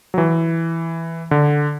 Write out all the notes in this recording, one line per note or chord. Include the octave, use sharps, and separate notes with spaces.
F#3
E3
D3